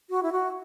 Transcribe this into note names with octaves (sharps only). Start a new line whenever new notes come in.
F#4
E4
F#4